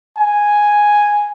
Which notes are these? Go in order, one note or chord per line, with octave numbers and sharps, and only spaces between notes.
G#5